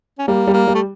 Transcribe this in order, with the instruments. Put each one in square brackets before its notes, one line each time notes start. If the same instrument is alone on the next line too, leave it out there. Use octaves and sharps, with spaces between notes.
[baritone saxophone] C#4
[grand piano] G3 [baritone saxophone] A#3
[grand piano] G3
[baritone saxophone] A#3
[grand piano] G3
[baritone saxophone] A3